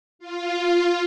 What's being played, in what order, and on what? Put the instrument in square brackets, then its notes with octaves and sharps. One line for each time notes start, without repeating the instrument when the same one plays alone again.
[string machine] F4